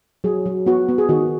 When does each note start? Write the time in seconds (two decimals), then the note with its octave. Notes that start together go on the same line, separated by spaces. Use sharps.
0.24 F#3 G#4
0.46 F#3
0.66 B3 F#4
0.89 B3
0.98 G#4
1.09 D#3 F#4